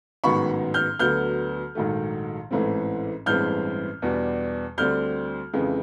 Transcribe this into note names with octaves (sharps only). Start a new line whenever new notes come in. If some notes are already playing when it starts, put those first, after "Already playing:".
A1 G#2 D#3 F#3 B3 B5 C#6
F6 G6
D2 D3 F#3 B3 F6 G6
A#1 G#2 D#3 F#3 A3
A1 G#2 E3 A3 C4
A1 G2 E3 G#3 C4 F6 G6
E2 B2 G3 B3 D4
D2 D3 G3 C4 F6 G6
F2 C#3 E3 G#3